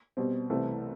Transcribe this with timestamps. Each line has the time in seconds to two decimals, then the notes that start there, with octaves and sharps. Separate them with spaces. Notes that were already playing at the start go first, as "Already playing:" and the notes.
0.17 B2 G3 C4
0.50 C2 C3 E3 A3 C4